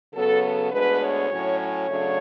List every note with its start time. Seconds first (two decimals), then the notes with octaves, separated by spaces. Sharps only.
0.13 C#3 F#3 B3 A4
0.42 A4
0.71 D2 D3 G#3 B3 B4
1.01 C#5
1.30 A2 F#3 C#4
1.60 C#5
1.88 C#3 F#3 A3 D4